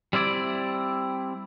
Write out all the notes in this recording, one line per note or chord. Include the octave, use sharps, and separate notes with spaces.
G3 C4 E4 D5